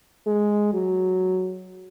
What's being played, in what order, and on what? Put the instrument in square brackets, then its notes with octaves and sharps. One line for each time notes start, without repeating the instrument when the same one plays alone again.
[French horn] G#3
F#3